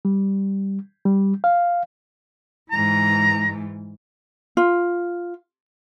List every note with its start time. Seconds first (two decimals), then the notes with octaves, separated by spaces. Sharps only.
0.05 G3
1.05 G3
1.44 F5
2.71 G#2 E3 A#5
4.57 F4